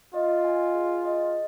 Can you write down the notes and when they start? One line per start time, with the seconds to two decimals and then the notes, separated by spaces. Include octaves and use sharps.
0.14 F4 D#5
0.44 G#5
0.75 G#4
1.05 D#5